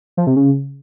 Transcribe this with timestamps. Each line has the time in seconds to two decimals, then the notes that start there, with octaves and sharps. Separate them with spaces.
0.17 F3
0.27 C3
0.36 C#3